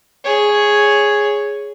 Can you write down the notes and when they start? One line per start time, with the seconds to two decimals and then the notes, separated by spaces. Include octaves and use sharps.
0.24 G#4 C#5